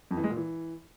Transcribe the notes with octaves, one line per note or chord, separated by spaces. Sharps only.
F2
E3
G#3
A#2
E3